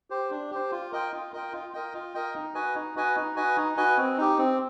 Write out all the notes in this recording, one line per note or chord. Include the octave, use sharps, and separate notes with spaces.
G4 C5
D4
G4 C5
F4
A#4 D#5 G5
F4
A#4 D#5 G5
F4
A#4 D#5 G5
F4
A#4 D#5 G5
D#4
F#4 B4 D#5 G#5
D#4
F#4 B4 D#5 G#5
D#4
F#4 B4 D#5 G#5
D#4
F#4 B4 D#5 G#5
C4
D#4 G4
C4